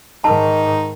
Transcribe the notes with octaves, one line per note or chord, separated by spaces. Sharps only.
G#2 D#3 D#4 A5